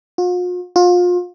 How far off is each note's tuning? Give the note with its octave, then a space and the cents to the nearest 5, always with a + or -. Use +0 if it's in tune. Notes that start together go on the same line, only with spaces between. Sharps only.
F4 +45
F4 +30